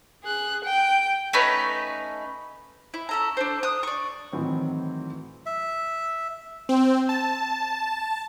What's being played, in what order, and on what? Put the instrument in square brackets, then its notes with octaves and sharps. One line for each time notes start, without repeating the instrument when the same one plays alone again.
[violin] G#4 F#6
G5
[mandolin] A3 C#4 D#4 B4
E4
C#4 A4 A#5
D4 A4 C5
D#6 F#6
D5 C#6
[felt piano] A2 D#3 E3 F#3 C4
[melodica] E5
[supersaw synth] C4
A5